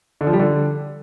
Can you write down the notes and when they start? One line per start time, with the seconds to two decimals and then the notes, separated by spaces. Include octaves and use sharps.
0.21 D3
0.27 F3
0.33 G3
0.39 D3